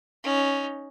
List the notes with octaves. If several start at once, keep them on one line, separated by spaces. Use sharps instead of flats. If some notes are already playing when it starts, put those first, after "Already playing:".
C#4 D#4